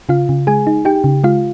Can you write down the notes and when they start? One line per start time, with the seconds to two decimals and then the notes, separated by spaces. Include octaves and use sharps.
0.09 C#3 F4 F5
0.29 C#3
0.47 G#3 G#4 G#5
0.67 D#4
0.85 D#4 G4 G5
1.04 C#3
1.24 G#3 F4 F5